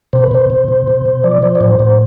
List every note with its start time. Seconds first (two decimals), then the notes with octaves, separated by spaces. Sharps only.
0.13 B2 C5
0.24 B4
0.31 B2 C5
0.50 B2
0.68 B2
0.88 B2
1.06 B2
1.24 F3 D5
1.42 F3 C5
1.55 D5
1.61 A2 C5
1.79 A2 C5